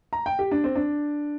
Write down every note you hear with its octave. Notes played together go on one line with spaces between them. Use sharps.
A#5
G5
G4
D4
C4
D4